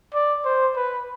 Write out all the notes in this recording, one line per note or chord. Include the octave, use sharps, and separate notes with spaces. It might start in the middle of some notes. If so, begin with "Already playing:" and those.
D5
C5
B4